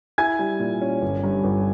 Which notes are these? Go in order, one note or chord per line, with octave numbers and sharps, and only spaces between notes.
E4 G#5 G#6
G3
A#2
C#4
G1
G2
G1